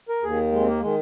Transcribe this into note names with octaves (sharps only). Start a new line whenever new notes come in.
A#4
D#2 D#3 G#4
G#3
C4
A#3
D#3 G#3